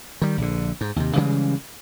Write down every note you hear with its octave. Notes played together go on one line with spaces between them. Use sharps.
D#3 G3
A#1 D3
G#2
D#2 C3
C#3 E3 G3 G#3